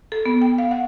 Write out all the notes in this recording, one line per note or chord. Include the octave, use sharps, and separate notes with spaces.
A4
B3
G5
F5
F#5